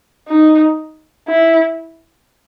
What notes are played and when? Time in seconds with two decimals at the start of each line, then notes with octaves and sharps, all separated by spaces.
0.28 D#4
1.28 E4